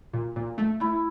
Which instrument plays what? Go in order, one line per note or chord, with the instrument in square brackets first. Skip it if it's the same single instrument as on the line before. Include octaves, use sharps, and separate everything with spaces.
[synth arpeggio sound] A#2
A#2
A3
[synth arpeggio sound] A3 [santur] E4